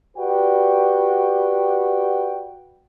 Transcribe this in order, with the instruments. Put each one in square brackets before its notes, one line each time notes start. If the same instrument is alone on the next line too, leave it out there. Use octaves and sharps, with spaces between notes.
[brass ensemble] F#4 G4 B4 D5 F#5 G5